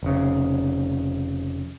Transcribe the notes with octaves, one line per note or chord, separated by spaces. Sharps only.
F1 C#3